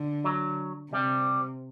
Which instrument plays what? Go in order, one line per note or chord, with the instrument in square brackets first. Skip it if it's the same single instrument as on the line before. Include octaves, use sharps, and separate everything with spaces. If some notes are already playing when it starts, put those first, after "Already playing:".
Already playing: [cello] D3
[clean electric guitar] F#3
[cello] C3 [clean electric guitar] G3